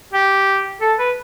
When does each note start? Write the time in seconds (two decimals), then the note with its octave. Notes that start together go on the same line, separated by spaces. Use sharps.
0.13 G4
0.81 A4
0.99 B4